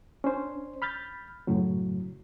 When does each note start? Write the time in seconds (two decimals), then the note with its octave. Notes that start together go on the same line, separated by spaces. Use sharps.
0.24 C#4 D4 C5
0.82 B5 F6 G6 A6
1.47 F#2 A2 C#3 F#3